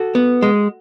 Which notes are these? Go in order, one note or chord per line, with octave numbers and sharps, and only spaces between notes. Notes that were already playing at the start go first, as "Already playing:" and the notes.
Already playing: F#4 A4
B3
G#3